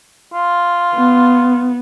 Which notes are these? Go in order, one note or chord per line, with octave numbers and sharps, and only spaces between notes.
F4
B3